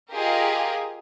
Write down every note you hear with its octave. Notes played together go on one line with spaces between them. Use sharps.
F4 G4 G#4 A#4 D#5